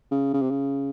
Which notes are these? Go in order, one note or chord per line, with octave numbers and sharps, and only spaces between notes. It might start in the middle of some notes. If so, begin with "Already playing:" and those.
C#3
C#3
C3
C#3